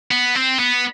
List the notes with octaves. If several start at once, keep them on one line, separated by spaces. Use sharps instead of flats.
B3
C4
B3